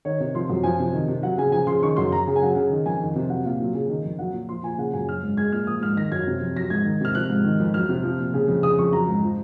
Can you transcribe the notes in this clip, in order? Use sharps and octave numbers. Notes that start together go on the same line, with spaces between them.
D#3 C#5
C3
F3 C6
F#2
F3 G#5
C3
D#3
C3
F#3 F#5
C#3 G#5
F3 G#5
C#3 C6
D#3 C#6
F#2 C6
F#3 A#5
C#3
G#5
F#3 F#5
C#3
D#3
F2 G#5
D#3
C3
F#3 F#5
A#2 F5
F#3
C#3
D#3
F2
F#3 F#5
A#2
F3 C6
A#2 G#5
C#3 F#5
F#2 G#5
F#3 F6
G#2
G#3 G#6
A#2 F6
F3 D#6
G#2 F6
D#3 A#6
F#2 G#6
C3
F2
F#3 A#6
G#2 G#6
D#3
C3 F6
F3 F#6
G#2
D#3
F2
F#3 F6
C3
F3
A#2
C#3
F2
C#3 D#6
F2 C#6
F#3 A#5
G#2
F3